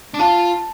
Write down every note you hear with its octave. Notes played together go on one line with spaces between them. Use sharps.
D4
F4 A5